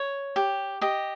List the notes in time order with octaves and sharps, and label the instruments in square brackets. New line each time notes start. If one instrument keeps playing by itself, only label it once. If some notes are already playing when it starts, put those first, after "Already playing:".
Already playing: [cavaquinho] C#5
G4
G4 D#5